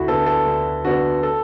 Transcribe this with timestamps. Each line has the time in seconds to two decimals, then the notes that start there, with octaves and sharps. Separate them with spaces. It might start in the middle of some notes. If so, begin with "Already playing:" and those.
Already playing: D2 E4 F#4
0.08 D3 B3 A4
0.26 A4
0.46 D2
0.85 D3 B3 F#4
1.23 A4